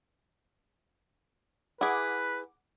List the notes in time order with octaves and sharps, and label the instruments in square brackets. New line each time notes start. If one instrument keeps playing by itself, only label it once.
[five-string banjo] E4 G#4 [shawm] B4 [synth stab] F#5 D6